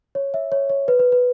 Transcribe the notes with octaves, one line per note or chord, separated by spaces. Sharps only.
C#5
E5
C#5
C#5
B4
B4
B4